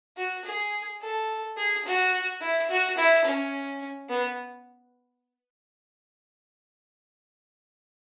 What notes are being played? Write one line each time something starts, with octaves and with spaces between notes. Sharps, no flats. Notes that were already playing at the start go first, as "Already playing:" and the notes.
F#4
G#4
A4
G#4
F#4
E4
F#4
E4
C#4
B3